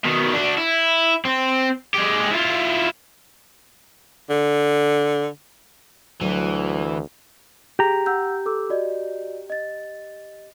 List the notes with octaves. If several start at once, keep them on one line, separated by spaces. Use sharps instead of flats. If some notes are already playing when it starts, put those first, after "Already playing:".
B2 D#3
D4 F#4
E4
C4
G#3 G4
E4 F4
D3
D2 E3 F#3
G4 G#4 A#5
F#5 E6 G6
A4 D6 E6
F#4 D5 D#5
D#5 A6